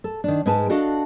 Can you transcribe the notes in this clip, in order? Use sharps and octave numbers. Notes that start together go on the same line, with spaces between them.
A4
D#3 D4
G#2 G#3 G#4 B4 G#5 A5
D4 F#4 A4 D#5 F5